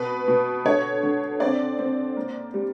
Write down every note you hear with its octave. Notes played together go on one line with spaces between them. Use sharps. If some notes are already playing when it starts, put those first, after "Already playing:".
Already playing: B2 B4
B2
D3 C#5
D3
C4 D5
C4
A#3
G3